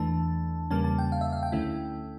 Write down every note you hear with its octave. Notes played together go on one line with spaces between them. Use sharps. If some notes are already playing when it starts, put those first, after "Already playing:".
Already playing: E2 E3 A3 D4 A5
E2 C#3 G3 A#3 C#4 A5
A5
G5
F5
E5
F5
G5
D2 D3 A3 C#4 E4